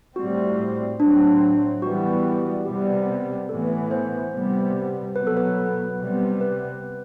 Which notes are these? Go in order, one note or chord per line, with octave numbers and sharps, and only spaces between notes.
A2 G3 C4 F#4
A2 F#3 C4 D4
E3 G3 B3 F#4
C3 G3 B3 G4
A2 E3 B3 A4
C5
C3 G3 B3
B2 F#3 B3 B4
A4
B4
C3 G3 B3
B4